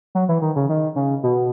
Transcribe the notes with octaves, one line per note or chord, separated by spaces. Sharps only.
F#3
E3
D#3
C#3
D#3
C#3
B2